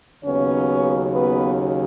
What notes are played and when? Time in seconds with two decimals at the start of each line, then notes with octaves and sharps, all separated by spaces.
0.25 D#2 C#3 F#3 B3 C#4 C#5
1.14 B3 B4